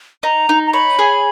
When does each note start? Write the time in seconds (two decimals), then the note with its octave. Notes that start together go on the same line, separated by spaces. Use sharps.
0.23 D#4 A#5
0.49 D#4
0.67 A#5
0.73 C#5 B5
0.99 G#4